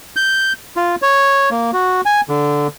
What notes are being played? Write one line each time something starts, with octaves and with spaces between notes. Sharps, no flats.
G6
F4
C#5
A#3
F#4
G#5
D3